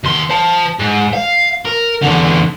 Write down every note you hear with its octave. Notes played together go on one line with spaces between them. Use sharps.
D#2 C6
C5 A5
G#2
F5
A#4
E2 D3